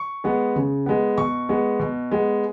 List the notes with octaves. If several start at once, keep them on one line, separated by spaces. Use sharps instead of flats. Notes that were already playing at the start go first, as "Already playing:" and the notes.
Already playing: C#6
G#3 B3
C#3
G#3 B3
B2 C#6
G#3 B3
B2
G#3 B3